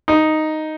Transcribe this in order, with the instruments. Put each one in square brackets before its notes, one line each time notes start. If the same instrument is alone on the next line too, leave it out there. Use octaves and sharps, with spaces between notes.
[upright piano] D#4